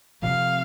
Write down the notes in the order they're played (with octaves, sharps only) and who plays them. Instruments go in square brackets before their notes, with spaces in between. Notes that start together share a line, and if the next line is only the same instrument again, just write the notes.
[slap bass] C3 F3 A3 [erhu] F5